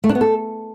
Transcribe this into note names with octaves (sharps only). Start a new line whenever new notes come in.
A3
D4
B3
A4